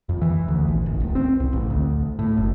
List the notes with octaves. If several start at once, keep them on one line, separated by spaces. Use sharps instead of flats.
F2
E3
D2
A#1
G#1
D1
C4
C2
A1
D2
A2
F#1